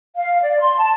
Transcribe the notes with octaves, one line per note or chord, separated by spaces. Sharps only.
F5
D5
C6
A5